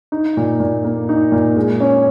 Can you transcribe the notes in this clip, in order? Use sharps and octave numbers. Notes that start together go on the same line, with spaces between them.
D#4
A#2
A#2
A#3
D#4
A#2
G#3
C#4